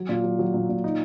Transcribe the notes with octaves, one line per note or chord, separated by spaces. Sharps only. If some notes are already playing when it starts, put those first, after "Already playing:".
Already playing: F#3
A#2
F#3
F#3
A#2
A#2
D#4